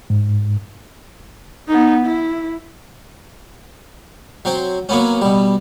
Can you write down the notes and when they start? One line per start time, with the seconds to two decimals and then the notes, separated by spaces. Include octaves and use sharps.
0.10 G#2
1.69 B3 D#4
2.06 E4
4.45 F#3 C4 C5
4.89 F#3 A#3 B3 C#4
5.21 B2 G3